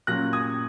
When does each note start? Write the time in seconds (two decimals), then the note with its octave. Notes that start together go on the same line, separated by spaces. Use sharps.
0.07 A#2 F#3 C#4 F#6 A#6
0.33 D#6 G#6